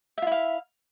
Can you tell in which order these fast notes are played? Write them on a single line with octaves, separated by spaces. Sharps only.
E5 F4 E4 F5